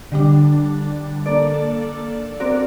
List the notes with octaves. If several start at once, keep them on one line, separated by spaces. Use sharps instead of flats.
D3 G3 D4
A#3 D4 A4 D5
C4 F#4 A#4 D5